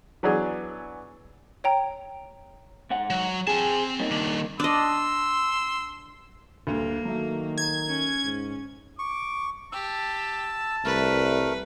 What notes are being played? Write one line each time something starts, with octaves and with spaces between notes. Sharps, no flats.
E3 F#3 B3 D4 G#4
C#5 G5 A#5
G#2 F#5
F#3
C4 G#4 A5
G3 A#3 D#4
D#3 D4
D4 D#5 C6 E6
D2 G2 D3 A#3
D#3 F#3 A3
G#6
C#4
G#2
C#6 D6
G4 A5 E6
C2 A3 A#4 B4